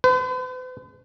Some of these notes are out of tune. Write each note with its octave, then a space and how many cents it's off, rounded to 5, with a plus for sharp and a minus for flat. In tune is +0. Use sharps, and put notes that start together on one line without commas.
B4 +45